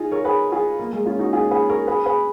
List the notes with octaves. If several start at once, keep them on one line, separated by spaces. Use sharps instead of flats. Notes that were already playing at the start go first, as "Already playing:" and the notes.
Already playing: D#4 F4 G#4
A#4 C#5
G#4 B4
F4 G#4
A#3
G#3
C#4 F4
D#4 F#4
F4 G#4
G#4 B4
A#4 C#5
G#4 B4
G#4 B4